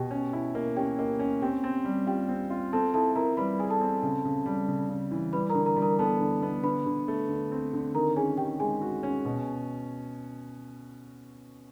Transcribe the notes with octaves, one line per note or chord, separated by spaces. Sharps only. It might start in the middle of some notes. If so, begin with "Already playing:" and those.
Already playing: B2 G4 G5
C#4
E4
A#3
C#4 G4 G5
A#3
C#4
C4 G4 G5
C4
G3
F4 G4 G5
C4
F4
C4 A4 A5
E4 A4 A5
E4 A#4 A#5
G3 B4 B5
G#4 G#5
A4 A5
C4
C#3
C#3
G3
C#3
C#3
E3
G3 B4 B5
D3 A#4 A#5
A#4 A#5
G3
A#4 A#5
B3 A4 A5
D3
B3
D3 B4 B5
D3
A3
D3
C4
D3
D#3 A#4 A#5
C#4 G#4 G#5
D#3 G4 G5
G#3 G#4 G#5
F#4
C#4
B2